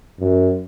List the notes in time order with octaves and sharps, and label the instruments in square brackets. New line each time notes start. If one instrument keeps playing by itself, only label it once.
[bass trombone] F#2